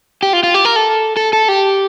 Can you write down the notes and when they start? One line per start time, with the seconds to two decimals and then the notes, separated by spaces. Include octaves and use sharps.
0.23 G4
0.33 F4
0.43 F4
0.54 G4
0.65 A#4
0.76 A4
1.17 A4
1.33 A4
1.48 G4